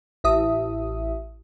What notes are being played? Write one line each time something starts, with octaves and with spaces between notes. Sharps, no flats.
A1 E5 D#6